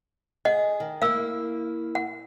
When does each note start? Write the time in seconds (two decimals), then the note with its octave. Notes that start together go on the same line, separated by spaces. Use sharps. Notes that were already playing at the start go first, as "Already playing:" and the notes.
0.45 G#4 D#5 F#5
0.80 D#3
1.02 A#3 E4 F5 E6
1.95 F#5